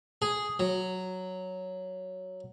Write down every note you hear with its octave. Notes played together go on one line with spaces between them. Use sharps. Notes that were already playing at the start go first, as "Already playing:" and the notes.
G#4
F#3